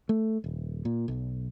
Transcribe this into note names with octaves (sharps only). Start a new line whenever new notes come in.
A3
D#1
A#2
B1